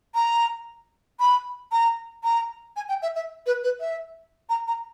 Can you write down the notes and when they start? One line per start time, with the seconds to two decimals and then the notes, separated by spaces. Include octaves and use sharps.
0.15 A#5
1.20 B5
1.72 A#5
2.24 A#5
2.76 G#5
2.89 G5
3.02 E5
3.15 E5
3.46 B4
3.63 B4
3.80 E5
4.49 A#5
4.68 A#5